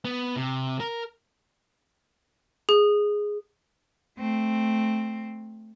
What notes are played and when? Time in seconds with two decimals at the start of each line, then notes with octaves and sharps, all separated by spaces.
0.05 B3
0.36 C3
0.80 A#4
2.69 G#4
4.18 A3 C4